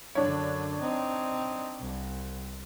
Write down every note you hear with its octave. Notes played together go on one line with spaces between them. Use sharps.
F#2 D3 D4 C#5
C4 D#4
C2